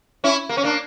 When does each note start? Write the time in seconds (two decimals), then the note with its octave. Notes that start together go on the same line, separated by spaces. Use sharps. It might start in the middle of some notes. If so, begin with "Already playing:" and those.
0.24 C#4 E4
0.49 A#3
0.57 C#4
0.64 A#3 D4